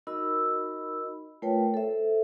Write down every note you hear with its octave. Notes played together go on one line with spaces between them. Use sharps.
D#4 F#4 A#4 D#5 B5 E6
A3 F4 A#4 B4 C#5 G5
A4 C5 E5